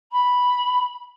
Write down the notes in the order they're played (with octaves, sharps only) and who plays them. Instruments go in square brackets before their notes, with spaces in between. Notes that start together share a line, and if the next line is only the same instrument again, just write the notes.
[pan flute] B5